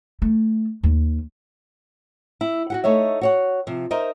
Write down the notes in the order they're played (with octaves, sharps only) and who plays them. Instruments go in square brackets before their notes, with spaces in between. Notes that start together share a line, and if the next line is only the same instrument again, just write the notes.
[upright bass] A3
D#2
[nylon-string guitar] E4
F#4 G4 F#5
A3 D#4 C#5 E5
F#4 C#5 F#5
C3 F3
D#4 A#4 C5 D#5 E5